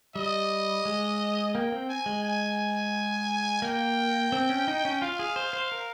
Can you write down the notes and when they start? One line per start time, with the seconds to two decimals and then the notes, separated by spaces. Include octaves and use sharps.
0.16 G3 D#5
0.86 G#3
1.54 A#3 G5
1.72 C4
1.89 G#5
2.06 G#3
2.24 G#5
3.62 A#3 G5
4.32 C4
4.50 C#4
4.68 D#4
4.85 C#4
5.02 F4 F5
5.19 G#4
5.36 C5
5.53 C5
5.72 A#4